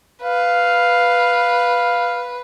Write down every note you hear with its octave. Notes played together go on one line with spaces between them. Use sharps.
B4 F5